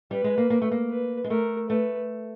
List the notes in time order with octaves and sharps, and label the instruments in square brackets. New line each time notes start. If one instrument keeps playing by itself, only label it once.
[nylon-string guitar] G3 [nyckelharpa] B4
[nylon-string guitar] G#3
A#3
A#3
A3
A#3
[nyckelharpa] B4
[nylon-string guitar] G#3
[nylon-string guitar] A3 [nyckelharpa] A#4
[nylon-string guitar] A3 [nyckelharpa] B4